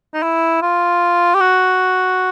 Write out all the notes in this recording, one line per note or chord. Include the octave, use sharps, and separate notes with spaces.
D#4
E4
F4
G4
F#4